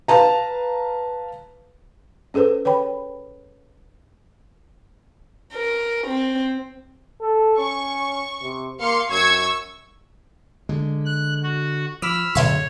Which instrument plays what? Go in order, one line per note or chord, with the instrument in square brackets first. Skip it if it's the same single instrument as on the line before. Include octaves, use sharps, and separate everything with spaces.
[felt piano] B4 F5 A5 A#5
[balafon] C#4 G#4 A4 B4 C5
B4 C#5 G5 B5
[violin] A#4
C4
[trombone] A4
[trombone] C#4 [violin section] C#6
[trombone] C3
[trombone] A#3 [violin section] F5 C6 C#7
[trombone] F#2 [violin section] C#6 E6 G#6
[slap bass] D3 G#3
[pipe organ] F#6
F#4
[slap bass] F3 [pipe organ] B5 E6 F6 [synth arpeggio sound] D6
[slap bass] D1 F#2 D3 [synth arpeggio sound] B2 E5 C6 [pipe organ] C#5